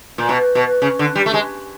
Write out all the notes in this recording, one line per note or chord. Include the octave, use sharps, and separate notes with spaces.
A#2
B2
B2
C#3
D3
G3
A3
G#3